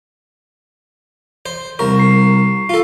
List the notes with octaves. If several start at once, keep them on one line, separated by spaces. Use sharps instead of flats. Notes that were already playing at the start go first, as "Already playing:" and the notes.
C5
C2 A#4 C#6
C7
F4 A4